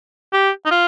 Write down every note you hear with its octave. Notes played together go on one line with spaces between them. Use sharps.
G4
D#4
F4